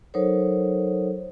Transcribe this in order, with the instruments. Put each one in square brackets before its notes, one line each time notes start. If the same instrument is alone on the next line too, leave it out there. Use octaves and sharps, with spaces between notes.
[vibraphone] F#3 D#4 A4 A#4 C5 C#5